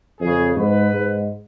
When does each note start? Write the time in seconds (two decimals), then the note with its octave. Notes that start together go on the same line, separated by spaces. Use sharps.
0.21 F2 C#3 G#4
0.56 G#2 B4
0.93 G#2